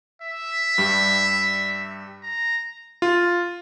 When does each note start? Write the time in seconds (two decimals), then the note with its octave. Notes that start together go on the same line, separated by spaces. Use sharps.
0.22 E5
0.78 G2 G3
2.22 A#5
3.02 F4